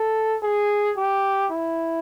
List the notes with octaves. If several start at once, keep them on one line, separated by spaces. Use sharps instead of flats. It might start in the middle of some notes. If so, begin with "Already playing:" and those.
Already playing: A4
G#4
G4
E4